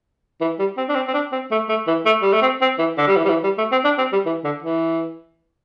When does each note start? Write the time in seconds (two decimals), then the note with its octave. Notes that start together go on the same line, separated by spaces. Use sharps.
0.41 E3
0.59 G3
0.77 C4
0.89 D4
0.95 C4
1.08 C4
1.14 D4
1.32 C4
1.51 A3
1.69 A3
1.87 E3
2.05 A3
2.22 G3
2.33 A3
2.42 C4
2.61 C4
2.79 E3
2.98 D3
3.07 G3
3.16 E3
3.25 G3
3.29 E3
3.43 G3
3.58 A3
3.72 C4
3.84 D4
3.98 C4
4.12 G3
4.26 E3
4.44 D3
4.63 E3